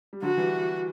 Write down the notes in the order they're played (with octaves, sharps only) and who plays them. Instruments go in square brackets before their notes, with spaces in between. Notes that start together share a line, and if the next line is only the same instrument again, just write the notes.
[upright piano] G3
[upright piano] D3 F#3 [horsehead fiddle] F#4
[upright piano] E3 G3